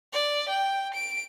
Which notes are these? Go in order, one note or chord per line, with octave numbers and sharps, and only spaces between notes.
D5
G5
D7